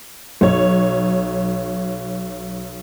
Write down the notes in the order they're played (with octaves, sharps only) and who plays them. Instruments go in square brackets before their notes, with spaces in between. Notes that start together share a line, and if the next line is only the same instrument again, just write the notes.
[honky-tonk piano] B1 C#5